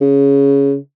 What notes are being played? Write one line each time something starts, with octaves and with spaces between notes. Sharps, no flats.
C#3